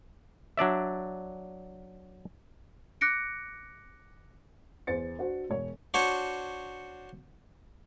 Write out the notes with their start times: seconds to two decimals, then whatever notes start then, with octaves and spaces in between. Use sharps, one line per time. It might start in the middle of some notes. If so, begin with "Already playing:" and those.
0.58 F#3 D4 D5 E5
3.01 D6 F#6 A#6 C#7 D7
4.87 E2 C5 A6 C#7
5.19 D4 F#4 C5
5.50 E1 C#5
5.94 D4 F#4 C5 C#5